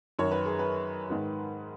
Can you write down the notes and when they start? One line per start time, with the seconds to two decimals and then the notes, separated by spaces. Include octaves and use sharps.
0.19 F#2 D#3 C#5
0.32 B4
0.46 G#4
0.59 B4
1.10 G#2 D#3